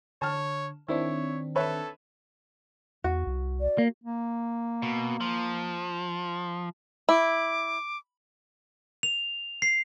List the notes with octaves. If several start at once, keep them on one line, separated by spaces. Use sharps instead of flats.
D3 C#5 A5 F6
D#3 C4 D4 E4 C#5
A4 B4 C#5 E5
E2 F#4
C2
D5
A#3
A#3
B2
F3
E4 D6
F7
C7